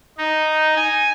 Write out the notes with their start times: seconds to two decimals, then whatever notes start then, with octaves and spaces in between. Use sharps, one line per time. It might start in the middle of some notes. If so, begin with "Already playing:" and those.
0.17 D#4
0.76 G#5